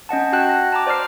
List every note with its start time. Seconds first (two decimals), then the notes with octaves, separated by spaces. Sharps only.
0.09 C#4 D#5 F#5 A5
0.33 F#4 F#5 G5 A5 F#6
0.49 A#6
0.72 A5 A#5 D6
0.86 C5 D5 D6 F6 C7